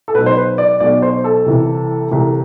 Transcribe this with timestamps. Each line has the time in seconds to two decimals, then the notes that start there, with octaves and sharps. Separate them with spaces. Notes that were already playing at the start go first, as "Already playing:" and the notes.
0.08 A4
0.15 B1 B2 B4
0.26 C5
0.37 B4
0.58 D5
0.80 B1 B2 D5
1.02 C5
1.24 A4
1.46 C2 C3 E3
2.11 C2 C3 E3